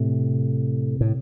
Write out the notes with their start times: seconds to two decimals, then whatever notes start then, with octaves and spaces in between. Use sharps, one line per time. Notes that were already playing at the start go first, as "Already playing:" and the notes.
Already playing: A2 C3
1.01 A2